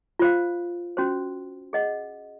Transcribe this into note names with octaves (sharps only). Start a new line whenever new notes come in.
F4 C5 F5
C#4 F#4 C5
G#4 D#5 F#5